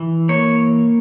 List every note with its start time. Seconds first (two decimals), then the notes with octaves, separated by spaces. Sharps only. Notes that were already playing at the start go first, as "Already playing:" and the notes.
Already playing: E3
0.29 A#3 C#5